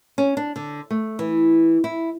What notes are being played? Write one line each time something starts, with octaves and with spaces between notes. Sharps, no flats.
C#4
D4
D3
A3
E3
E4